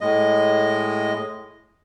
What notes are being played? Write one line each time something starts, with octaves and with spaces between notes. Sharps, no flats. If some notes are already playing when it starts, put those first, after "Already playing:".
A2 G#3 D#5